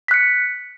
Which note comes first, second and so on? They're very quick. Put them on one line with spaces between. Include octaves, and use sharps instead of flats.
B6 F#6 C#7